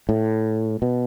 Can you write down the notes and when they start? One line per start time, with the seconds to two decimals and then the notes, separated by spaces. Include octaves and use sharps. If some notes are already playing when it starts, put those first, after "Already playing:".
0.09 A2
0.82 B2